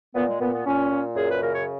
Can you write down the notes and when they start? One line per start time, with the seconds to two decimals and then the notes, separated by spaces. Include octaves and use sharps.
0.15 A#2 B3
0.28 G#3
0.40 A#2 B3
0.53 B3
0.65 A#2 C#4
0.91 A#2
1.16 F#2 G#4
1.28 B4
1.41 C#3 A#4
1.53 C#5